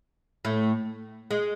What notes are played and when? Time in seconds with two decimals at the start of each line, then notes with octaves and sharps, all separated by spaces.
0.45 A2 A3
1.31 G#3